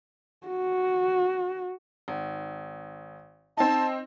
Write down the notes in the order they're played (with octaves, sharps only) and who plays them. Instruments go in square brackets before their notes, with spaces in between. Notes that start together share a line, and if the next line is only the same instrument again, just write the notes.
[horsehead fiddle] F#4
[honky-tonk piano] G#1
[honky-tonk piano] C4 D#4 [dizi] A5